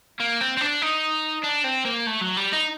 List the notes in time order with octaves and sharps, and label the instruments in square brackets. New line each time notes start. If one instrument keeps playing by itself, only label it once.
[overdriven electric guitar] A#3
C4
C4
D4
D#4
D4
C4
A#3
A3
F#3
G3
D#4